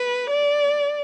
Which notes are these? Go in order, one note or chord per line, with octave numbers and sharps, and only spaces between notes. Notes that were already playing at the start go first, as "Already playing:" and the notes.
Already playing: B4
D5